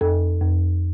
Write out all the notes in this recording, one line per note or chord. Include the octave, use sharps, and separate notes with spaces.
F2 A4
F2